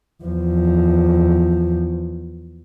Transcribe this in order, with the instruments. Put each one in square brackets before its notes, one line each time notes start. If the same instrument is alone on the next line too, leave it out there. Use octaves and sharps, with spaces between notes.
[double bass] E2 F3